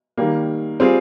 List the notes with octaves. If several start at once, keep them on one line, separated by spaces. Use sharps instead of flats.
D#3 G3 A#3
G3 C4 F4 G#4